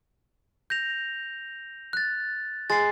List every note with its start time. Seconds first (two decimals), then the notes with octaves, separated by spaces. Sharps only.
0.70 G6 A#6 F7
1.93 F#6 A6
2.70 G#3 A6 C7